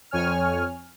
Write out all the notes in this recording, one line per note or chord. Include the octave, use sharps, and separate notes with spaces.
F2 C#5 G#5 F6